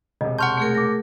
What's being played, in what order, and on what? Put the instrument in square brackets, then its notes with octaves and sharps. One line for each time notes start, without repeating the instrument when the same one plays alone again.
[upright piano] E1 C3 [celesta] D#5
[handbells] F#5 F6 G6 [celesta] A5 C6 C#6
[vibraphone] A3 G#4 A#4
[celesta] D6 A#6